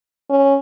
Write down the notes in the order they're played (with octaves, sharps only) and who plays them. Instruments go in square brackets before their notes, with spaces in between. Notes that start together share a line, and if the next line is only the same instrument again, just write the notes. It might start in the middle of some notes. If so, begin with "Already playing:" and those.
[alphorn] C#4